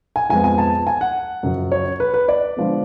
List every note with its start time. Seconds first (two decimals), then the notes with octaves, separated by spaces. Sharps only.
0.16 G#5
0.30 F2 F3 G#3 B3 G#5
0.44 G#5
0.58 A5
0.87 G#5
1.01 F#5
1.43 F#2 C#3 F3
1.72 C#5
2.00 B4
2.14 B4
2.28 D5
2.56 D3 F3 G#3 B3